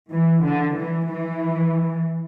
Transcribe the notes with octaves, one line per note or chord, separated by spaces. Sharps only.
E3
D3
E3
E3